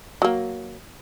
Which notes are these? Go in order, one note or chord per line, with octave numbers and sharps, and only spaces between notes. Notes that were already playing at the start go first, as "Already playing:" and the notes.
F#3 A#3